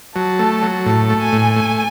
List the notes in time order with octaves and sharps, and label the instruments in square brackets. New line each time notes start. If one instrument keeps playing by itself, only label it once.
[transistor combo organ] F#3 [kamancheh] A5
[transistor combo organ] A3
F#3
[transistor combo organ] A2 [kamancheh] A5
[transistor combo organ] A3
[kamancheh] G#5
[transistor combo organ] A2
A3